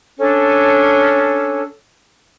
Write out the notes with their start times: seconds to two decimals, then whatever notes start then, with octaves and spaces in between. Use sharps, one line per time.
0.18 C#4 D4 A4